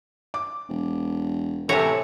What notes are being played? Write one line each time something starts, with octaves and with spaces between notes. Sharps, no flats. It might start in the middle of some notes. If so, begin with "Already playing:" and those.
D6
E1
A2 C3 E3 A4 C#5 E5 G#5 A#5